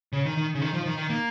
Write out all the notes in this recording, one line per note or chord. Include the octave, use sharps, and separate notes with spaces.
C#3
D#3
D#3
C#3
D#3
F3
D#3
D#3
A#3